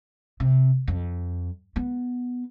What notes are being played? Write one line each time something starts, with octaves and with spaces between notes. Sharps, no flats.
C3
F2
B3